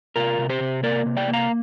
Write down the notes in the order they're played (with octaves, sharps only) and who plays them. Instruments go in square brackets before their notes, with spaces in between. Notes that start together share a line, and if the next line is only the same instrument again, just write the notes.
[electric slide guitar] C3 F4 A#4
C3
G4 C5
C3
A#3 A#4 D5
C3
D5 G5
A#3
F5 A#5